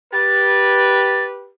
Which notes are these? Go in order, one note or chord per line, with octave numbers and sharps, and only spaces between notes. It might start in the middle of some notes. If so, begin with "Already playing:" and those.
G4 B4 A6